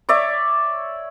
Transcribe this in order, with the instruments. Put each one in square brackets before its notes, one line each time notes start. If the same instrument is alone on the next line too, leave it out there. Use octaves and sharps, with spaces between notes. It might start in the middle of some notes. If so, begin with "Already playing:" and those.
[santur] C#5 D5 E5